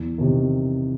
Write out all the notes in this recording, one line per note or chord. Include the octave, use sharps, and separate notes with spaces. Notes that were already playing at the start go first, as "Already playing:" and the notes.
Already playing: E2
C3 D#3